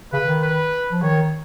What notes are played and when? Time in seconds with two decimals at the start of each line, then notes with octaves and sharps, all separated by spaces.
0.13 C#3 B4
0.28 D#3
0.43 B4
0.92 F3
1.02 D#3 C#5